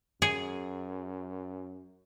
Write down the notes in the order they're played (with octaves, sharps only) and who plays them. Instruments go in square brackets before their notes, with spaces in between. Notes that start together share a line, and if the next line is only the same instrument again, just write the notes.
[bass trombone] F#2 [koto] G#4